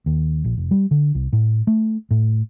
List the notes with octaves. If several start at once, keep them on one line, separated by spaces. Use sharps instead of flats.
D#2
A#1
F1
G3
D3
C2
A2
A3
A2